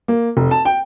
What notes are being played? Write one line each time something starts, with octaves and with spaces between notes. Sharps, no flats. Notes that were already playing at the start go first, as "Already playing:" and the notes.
A#3
F1
A5
G5